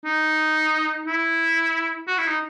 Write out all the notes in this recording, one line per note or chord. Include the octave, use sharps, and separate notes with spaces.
D#4
E4
F#4
E4
D#4